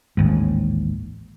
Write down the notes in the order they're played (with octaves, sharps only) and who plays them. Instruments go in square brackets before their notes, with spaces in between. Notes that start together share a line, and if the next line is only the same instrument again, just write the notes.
[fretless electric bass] A1 D#2 G#2